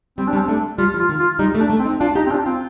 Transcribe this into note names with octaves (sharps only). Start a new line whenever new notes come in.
G3 C4
D4
G3
C4
A3 D4
G3 F4
F3
F4
D#3
F4
G3 D#4
A3
D4
A3
C4
D#4
D4 F4
D#4 G4
C4
D4 F4
C4 F4